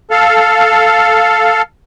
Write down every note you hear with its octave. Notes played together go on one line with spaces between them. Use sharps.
A4 F5